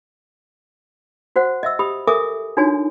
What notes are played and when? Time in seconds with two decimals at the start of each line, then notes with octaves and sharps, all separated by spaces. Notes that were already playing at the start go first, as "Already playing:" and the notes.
1.36 F#4 C5 F#5
1.63 D#5 E5 E6
1.79 G4 B5 D#6
2.07 A4 A#4 E5 G#5 D6 D#6
2.57 D4 D#4 F4 F#4 C#5 G#5